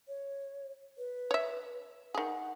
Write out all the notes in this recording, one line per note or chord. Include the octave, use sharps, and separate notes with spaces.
C#5
B4
C#5 E5
D#3 G#4 F#5